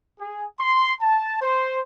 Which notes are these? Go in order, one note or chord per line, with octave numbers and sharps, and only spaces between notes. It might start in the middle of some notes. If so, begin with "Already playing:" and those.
G#4
C6
A5
C5